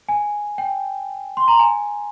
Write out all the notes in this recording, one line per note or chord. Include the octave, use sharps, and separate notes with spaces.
G#5
G5
C6
A#5
G#5